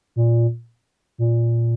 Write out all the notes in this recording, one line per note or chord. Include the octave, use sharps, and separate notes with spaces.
A#2
A#2